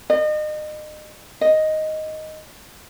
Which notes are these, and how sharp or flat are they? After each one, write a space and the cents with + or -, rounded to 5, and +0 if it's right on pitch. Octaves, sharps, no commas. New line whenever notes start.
D#5 -35
D#5 +0